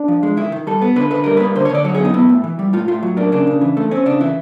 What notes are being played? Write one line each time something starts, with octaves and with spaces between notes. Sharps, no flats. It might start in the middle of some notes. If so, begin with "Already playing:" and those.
Already playing: D4
F3
G#3
D#3 E4
D#3
G3 A4
B3
D3 B4
D3 B4
G3 A#4
A#3 B4
D3 C5
C#5
D3
D5
F#3 C#5
G#4
B3
D#4
B3 E4
A2
E3
G3
A2 F4
A2 F4
F#3
A#3 D4
C#3 D4
C#3
E3
A3
C4 C#4
C#3 D4
E3 E4